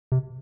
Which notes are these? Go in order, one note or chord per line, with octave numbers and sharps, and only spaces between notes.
C3